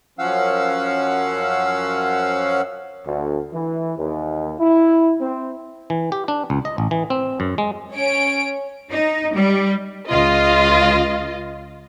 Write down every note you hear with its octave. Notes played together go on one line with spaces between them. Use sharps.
F#2 F3 C#4 F5 F#5 E6
D2
E3
D#2
E4
C4
E3
G4
D4
C#2
D#5
A1
E3
C4
F#2
G#3
C#4 C#5 D7
D#4
G3
C#2 F4 D#5